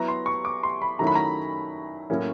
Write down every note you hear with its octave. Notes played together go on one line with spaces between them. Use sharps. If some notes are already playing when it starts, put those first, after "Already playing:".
Already playing: F#3 B3 E4 A#5
C6
C#6
D6
C6
B5
D#3 F#3 A3 C#4 E4 A#5
B5
A#5
A2 F#3 A#3 C#4 E4